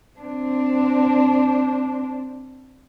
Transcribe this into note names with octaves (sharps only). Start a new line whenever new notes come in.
C4 D4